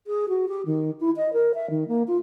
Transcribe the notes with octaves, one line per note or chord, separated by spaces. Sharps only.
G#4
F#4
G4
D#3
E4
D#5
A#4
E5
D#3
A#3
F4